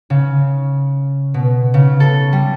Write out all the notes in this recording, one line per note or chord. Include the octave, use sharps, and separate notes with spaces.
C#3
B2
C#3
A4
G3